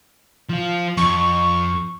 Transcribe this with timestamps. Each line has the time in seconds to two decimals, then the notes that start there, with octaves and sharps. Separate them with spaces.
0.50 F3 F4
0.97 F2 C#6